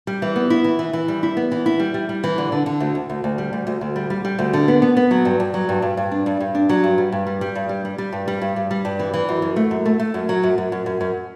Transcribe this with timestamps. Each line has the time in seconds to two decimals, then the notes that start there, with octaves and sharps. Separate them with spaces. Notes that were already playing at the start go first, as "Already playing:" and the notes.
0.07 G3
0.22 E3
0.36 B3
0.50 E4
0.64 E3
0.79 E3
0.93 E3
1.08 G3
1.23 E4
1.37 B3
1.52 E3
1.66 E4
1.80 G3
1.94 G3
2.09 G3
2.24 E3
2.38 D3
2.52 D3
2.66 D3
2.80 D2
2.95 D2
3.10 D2
3.24 D2
3.38 G3
3.53 D2
3.67 D2
3.81 D2
3.96 G3
4.10 G3
4.25 G3
4.39 D2
4.53 D3
4.68 B3
4.82 B3
4.97 B3
5.11 F#3
5.25 G2
5.40 G2
5.54 F#3
5.69 G2
5.82 G2
5.97 G2
6.11 D4
6.26 G2
6.40 G2
6.55 D4
6.69 F#3
6.83 G2
6.98 G3
7.12 G2
7.27 G3
7.41 G3
7.55 G2
7.69 G3
7.85 G3
7.98 G3
8.13 G2
8.28 G3
8.42 G2
8.56 G2
8.71 G3
8.85 G2
8.99 E3
9.14 E3
9.29 F#2
9.42 F#2
9.56 A3
9.71 F#2
9.85 A3
10.00 A3
10.14 F#2
10.29 F#3
10.43 F#2
10.58 F#2
10.72 F#2
10.86 F#2
11.01 F#2